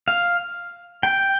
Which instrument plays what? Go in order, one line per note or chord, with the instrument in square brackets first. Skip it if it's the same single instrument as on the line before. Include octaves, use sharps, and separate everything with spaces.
[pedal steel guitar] F5
G5